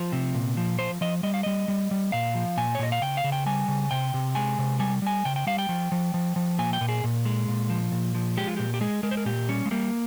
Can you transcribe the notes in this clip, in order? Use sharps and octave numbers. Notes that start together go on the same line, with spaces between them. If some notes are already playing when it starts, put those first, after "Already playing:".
Already playing: F3 C5
C3
A#2
F3
F3 C5
F3 D#5
G3 D#5
F5
G3 D#5
G3
G3
A#2 F5
F3
A#2 G#5
C#5
A#2 D#5
F5
C#3 G5
F5
C#3
G5
G3 G#5
C#3
C3 G5
C3
G#3 G#5
C3
G3 G#5
G3 G#5
C#3 G5
G5
G3 F5
G5
F3
F3
F3
F3
A#2 G#5
G5
A#2
G#4
A#2
G#3
A#2
F3
A#2
F3
G#3 G4
F4
A#2 G4
G4
G#3 G#4
G#3 A#4
C5
A#4
A#2 G4
G3 C#4
G#3
G3 A#3